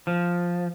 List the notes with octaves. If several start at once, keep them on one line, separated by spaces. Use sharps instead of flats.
F3